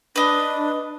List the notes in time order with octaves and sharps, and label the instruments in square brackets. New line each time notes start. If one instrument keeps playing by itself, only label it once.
[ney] D4 [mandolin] B4 D#5